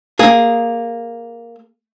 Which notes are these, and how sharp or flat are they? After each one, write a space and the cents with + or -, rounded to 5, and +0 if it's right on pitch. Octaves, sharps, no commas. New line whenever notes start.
A#3 +0 G#4 +0